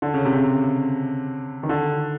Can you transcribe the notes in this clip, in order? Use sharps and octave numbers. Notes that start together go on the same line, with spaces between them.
D3
C#3
C3
C#3
D#3
D3